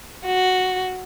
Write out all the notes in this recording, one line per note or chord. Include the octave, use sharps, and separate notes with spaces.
F#4